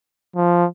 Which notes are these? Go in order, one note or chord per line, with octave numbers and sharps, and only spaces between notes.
F3